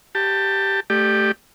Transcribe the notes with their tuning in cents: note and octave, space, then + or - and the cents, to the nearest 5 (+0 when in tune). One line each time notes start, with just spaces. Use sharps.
G4 +0 A5 +20
A3 +0 G4 +0 D5 +35